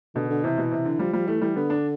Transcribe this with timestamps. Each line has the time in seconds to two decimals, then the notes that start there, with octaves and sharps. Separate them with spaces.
0.15 B2 D3
0.29 D3
0.44 C3 E3
0.58 B2
0.71 C3
0.85 D3
0.99 F3 G3
1.13 F3 G3
1.27 E3 A3
1.42 E3 G3
1.56 D3 B3
1.70 D4